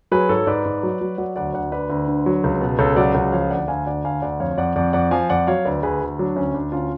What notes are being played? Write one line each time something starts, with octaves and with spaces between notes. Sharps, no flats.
F#3 G#4 B4
G#2 A4 C#5
G#2 B4 D5
G#2
F#3
F#3
F#3 D5 F#5
D2 D5 F#5
D2 D5 F#5
D3 B4 D5
D2
D3
F#3
C#2
B2
C#2 A4 C#5
F#3 D5 F#5
C#2 D5 F#5
F3 C#5 F5
D2 D5 F#5
D2 F5 G#5
D2 D5 F#5
D2 F5 G#5
D2 D5 F#5
F2 C#5 F5
F2 D5 F#5
F2 D5 F#5
F2 D5 F#5
F3 F5 G#5
F2 D5 F#5
F#3 C#5 F5
D2 B4 D5
D2 G#4 B4
D2
F#3 D4
D2 C#4
D2 D4
D2 C#4 F4